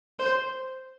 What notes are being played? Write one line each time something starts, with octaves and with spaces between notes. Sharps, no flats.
C5